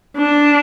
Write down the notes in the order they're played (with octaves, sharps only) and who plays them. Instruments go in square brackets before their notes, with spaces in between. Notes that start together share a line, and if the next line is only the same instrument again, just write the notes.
[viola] D4